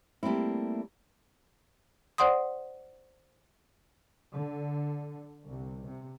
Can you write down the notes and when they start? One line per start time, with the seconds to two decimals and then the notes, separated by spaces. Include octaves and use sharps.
0.23 G3 A3 A#3 C4 E4
2.18 C5 D5 F#5 C6 D#6
4.33 D3
5.49 C2
5.87 C3